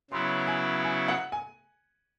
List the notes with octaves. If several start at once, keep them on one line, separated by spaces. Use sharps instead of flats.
C#3 F#3 B3 E4 C6
G#5
G#5
F#5
G#5